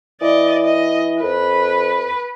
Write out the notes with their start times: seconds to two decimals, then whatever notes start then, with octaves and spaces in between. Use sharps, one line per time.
0.21 E3 D5 D#5
0.64 D#5
1.23 F2 B4